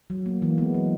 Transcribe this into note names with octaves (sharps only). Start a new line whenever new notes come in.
F#3
A#3
E3 A#3
G#3 B3
F#3